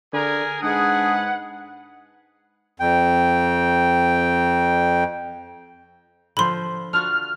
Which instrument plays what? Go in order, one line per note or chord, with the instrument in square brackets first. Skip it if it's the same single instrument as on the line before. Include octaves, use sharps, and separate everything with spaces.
[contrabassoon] D3 [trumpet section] G#4 A#4 G#5
[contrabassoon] G#2 [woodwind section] G#3 D4 G#4 [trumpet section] B4 F#5
[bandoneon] F2 G5
[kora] D3 F3 C5 [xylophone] B5 C6
[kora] D4 F4 F#4 [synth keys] F6